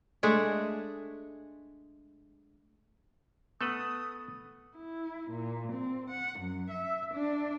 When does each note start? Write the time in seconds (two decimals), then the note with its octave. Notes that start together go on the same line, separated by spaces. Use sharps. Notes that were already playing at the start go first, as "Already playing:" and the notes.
0.23 G#3 A3 D4 G#4
3.61 A3 B3 A4 B4 D#6
4.76 E4
5.31 A#2
5.72 C4
6.10 F#5
6.40 F#2
6.70 E5
7.14 D4